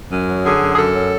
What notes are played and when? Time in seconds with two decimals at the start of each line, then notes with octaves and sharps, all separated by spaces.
0.10 F#2
0.27 F#3
0.43 D3 G#4
0.61 F#2
0.72 G#4
0.78 F#2 A4
0.95 F#3